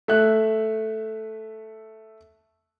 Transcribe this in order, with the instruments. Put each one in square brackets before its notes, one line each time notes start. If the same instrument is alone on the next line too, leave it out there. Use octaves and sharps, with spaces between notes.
[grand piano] A3 E5 F#6